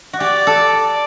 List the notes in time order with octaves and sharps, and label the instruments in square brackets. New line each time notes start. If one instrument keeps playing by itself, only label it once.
[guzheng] F#4
[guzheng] G4 [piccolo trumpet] D5
[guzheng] A4
[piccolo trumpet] D5